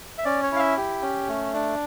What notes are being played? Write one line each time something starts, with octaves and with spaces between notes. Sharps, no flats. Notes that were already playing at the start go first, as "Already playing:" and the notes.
E5
C#4 D5
C#5
E4 F5
E5
G4
C#4
A3
D4